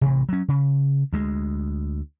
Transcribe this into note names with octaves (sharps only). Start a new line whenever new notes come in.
A1 C3
F#3 C#4
C#3
D2 G#3